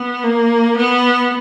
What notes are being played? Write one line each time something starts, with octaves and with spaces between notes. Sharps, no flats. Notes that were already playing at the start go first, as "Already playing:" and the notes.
Already playing: B3
A#3
B3